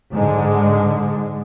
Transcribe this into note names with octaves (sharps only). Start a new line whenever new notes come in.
G#2 D3 G#3